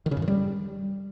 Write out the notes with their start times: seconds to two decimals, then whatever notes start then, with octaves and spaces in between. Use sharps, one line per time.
0.06 D#3
0.11 C#3
0.17 F#2
0.22 D#3
0.28 G3